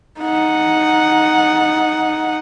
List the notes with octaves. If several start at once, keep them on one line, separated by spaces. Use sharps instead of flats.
D#4 F#5